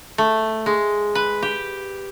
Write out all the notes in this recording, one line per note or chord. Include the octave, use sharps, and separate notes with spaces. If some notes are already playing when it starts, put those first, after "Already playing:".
A3
G#3
B4
G4